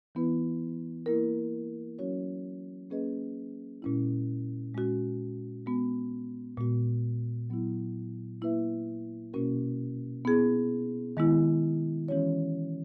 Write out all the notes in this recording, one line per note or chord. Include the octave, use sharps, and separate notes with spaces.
E3 B3 E4 B4
A#3 E4 A#4
F#3 C#4 F#4 C#5
A#3 C#4 G#4 B4 D#5
A#2 G#3 C#4 E4
A#2 G#3 C#4 F#4
G#3 B3 F#4
A#2 G#3 B3 F#4
F#3 B3 E4
A#3 E4 B4 E5
B2 A#3 C#4 F#4 A#4
B3 E4 G#4
D#3 G#3 B3 E4
E3 G#3 C#4 F#4 C#5